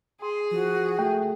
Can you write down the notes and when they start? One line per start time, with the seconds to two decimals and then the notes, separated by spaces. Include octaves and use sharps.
0.22 G#4 C6
0.51 F3 F#4
0.99 A3 G5